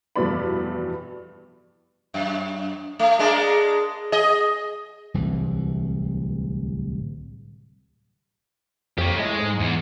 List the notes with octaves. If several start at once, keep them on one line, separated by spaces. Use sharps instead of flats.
F1 G2 B2 E3 D5 B5
F#2
A3
G#3 A#3 D4
G#4 D#5
D1 C2 E3
F2 G4 C#5
A2 G#3 D#5
G#2
E2